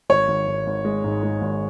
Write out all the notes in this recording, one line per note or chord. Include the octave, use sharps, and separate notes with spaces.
G#1 C#5
G#1
G#1
G#1
G#3
G#2
G#3
G#1